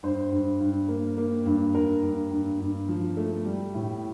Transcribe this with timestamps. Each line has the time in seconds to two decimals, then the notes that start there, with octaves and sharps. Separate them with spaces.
0.03 G2 C5
0.32 G2
0.60 G2
0.88 A#3
1.18 A#3
1.46 G2
1.75 G2 A#4
2.03 G2
2.31 G2
2.60 G2
2.89 F3
3.17 A3
3.45 G3
3.74 A2